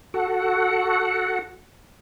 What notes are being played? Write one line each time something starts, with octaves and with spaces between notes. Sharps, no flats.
F#4 A4 F#5